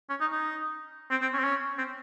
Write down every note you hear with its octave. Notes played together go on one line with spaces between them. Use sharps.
C#4
D#4
D#4
C4
C4
C#4
C4
C#4
C4